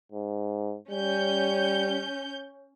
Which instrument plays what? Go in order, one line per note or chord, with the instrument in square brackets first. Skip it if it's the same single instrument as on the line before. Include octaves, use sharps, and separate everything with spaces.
[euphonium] G#2
[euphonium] G3 [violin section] C#4 G6